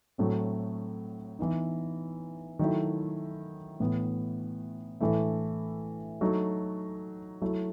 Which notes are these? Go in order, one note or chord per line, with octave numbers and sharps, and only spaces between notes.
A2 F#3 A3 C4
E3 B3 D#4
D#3 F#3 A3 E4
A2 E3 B3
A2 E3 A3 E4
F#3 A3 D#4
F#3 A3 E4